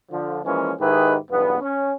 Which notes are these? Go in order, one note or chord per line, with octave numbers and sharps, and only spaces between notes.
D3 F3
E3 F3 G#3 A#3 C#4
G#2 D#3 E4 G4 G#4 B4
B1 E2 G2 B3
C#4